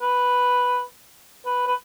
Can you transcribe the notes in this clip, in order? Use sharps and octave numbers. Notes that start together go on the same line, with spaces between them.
B4
B4
B4